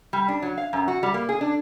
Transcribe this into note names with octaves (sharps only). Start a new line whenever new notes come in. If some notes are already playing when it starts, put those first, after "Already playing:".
G3
D4
F#3
F5
F#2
F#4
G3
A#3
G#4
D4